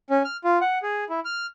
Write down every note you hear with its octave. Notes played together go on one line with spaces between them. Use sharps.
C#4
F6
F4
F#5
G#4
E4
F6